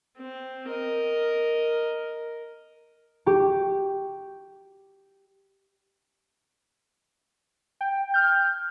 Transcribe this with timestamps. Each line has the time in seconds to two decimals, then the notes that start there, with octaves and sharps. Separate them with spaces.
0.17 C4
0.68 A#4 D#5
3.26 G4 C#6
7.81 G5
8.14 F6 G6